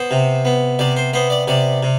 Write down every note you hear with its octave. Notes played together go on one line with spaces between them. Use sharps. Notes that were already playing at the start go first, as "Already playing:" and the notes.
Already playing: B3 C5
C3
B3
C3 D5
C5
B3 C5
D5
C3 D5
C3